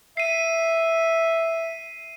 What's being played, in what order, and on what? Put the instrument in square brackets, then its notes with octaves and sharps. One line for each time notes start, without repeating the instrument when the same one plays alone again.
[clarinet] E5 [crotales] C7 D#7